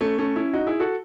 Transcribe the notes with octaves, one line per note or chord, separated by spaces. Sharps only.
A3 C#4
A3 C#4
C#4 E4
D#4 F#4
E4 G#4
F#4 A4